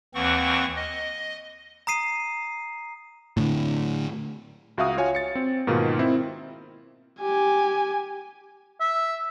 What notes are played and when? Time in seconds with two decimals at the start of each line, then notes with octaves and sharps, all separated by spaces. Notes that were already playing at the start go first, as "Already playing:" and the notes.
0.15 D#2 E3 C4 F#5 C#6
0.76 D#5
1.87 A#5 D#6 C7 D#7
3.37 A2 D3
4.78 C#2 F#4 E5 F5 D#6
4.97 F4 F#4 C#5 F5 G#5
5.15 A6 C#7
5.35 C4
5.67 G#2 B2 D#3 A#3 F4
5.99 C4 E4
7.21 G4 G#5
8.80 E5